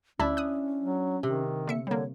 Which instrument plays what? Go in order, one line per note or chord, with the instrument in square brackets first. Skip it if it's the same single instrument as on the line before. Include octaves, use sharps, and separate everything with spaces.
[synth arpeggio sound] D2 A5 B5 [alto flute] C#4 [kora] D4 E4
[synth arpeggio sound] D#6 F#6
[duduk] F#3
[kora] C3 [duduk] D#3
[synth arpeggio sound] D3 E5 C#7 [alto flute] A#3
[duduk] D3 [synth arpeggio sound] G3 A#3 [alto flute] C#5